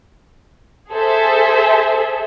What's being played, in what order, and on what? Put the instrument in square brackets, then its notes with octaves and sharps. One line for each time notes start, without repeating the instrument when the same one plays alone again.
[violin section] G#4 A4 C5 E5